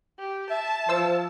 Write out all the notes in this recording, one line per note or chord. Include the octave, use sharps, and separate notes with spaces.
G4
E5 A5
F3 C5 E6